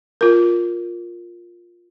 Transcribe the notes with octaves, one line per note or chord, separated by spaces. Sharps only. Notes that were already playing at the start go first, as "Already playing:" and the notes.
F4 A#4